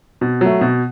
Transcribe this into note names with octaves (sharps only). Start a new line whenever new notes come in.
B2
F#3 A3
B2